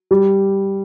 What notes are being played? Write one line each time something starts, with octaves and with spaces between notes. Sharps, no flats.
G3